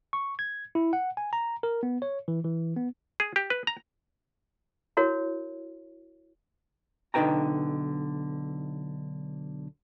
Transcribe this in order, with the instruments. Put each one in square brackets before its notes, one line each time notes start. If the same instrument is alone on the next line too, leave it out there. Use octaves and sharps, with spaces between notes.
[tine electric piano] C#6
G#6
E4
F#5
G#5
A#5
A#4
B3
C#5
E3
E3
B3
[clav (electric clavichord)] G#4
G4
B4
A#5
[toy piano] E4 F#4 A#4 C#5
[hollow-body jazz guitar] B1 D3 D#4 B4 G5 A#5